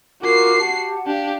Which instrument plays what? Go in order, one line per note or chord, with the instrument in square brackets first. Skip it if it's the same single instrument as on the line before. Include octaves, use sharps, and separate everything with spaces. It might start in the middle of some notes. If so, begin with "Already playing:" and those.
[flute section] F4 A#4 D6 [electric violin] F#4 C7
[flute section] G4 F#5 A5
[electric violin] D4 G4 [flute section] F5